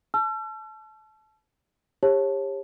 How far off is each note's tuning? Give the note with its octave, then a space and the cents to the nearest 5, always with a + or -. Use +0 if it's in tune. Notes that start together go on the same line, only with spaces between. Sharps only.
A5 -25 E6 +45
G4 +30 C#5 -30 A5 -5